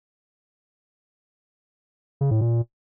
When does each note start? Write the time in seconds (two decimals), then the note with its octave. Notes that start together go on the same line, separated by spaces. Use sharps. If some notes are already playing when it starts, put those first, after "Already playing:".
2.21 C#3
2.31 A2
2.41 A#2